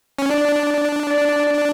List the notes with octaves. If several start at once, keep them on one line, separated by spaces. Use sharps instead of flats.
C#4
D4 D5
D5